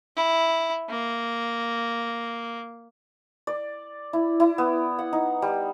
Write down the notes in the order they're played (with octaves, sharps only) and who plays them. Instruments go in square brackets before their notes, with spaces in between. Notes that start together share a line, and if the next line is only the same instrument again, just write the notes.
[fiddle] E4
A#3
[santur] D5
E4
E4
B3
F#5
D#4
G3